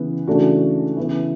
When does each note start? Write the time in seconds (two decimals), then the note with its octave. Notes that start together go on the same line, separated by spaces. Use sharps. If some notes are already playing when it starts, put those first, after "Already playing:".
Already playing: C#3 E3 B3
0.27 C#3 E3 A3 D4 F#4
0.97 C#3 E3 B3 E4